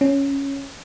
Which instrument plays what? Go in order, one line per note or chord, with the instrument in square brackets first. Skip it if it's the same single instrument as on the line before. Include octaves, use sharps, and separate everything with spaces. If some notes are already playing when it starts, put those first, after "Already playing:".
[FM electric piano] C#4